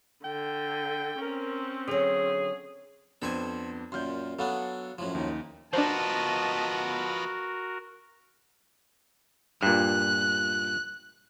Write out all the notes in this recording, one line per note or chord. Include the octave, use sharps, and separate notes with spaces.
D3 G5
C4 C#4 A#4
D3 F#3 G#4
F2 B3 D4 A4 C5 G#5
F#2 A#2 C6 F6 G6
F#3 B3 D4 A4 F5
F#2 A2 F3
D#2 D#4
F3 B3 D4 F#4 A#4 C5 D#5 A5
G2 A#2 F#6